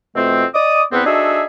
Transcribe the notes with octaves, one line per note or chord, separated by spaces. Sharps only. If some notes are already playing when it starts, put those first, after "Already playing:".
F2 B2 A3 C4
D5 D#5 D6 D#6
E2 B3 C4
D4 D#4 F#4 G#4 A4 E5